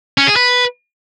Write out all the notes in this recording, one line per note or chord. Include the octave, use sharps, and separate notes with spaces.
C#4
G#4
B4